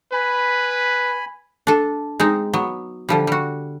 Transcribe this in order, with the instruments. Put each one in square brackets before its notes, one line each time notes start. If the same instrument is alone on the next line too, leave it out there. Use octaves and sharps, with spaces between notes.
[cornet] B4 [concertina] G#5 B5
[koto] D4 A4
G#3 C4 D#4
F#3 B3
D3 F3 G3
G3 F#4